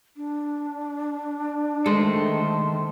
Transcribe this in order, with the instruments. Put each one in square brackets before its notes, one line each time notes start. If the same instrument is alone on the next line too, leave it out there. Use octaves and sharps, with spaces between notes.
[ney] D4
[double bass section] D#3 A3 [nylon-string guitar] G#3 [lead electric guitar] A4 C5